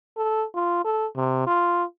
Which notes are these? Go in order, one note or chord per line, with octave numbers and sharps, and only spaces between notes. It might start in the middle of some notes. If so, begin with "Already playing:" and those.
A4
F4
A4
C3
F4